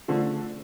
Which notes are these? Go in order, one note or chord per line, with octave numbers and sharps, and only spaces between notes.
D3 F3 A3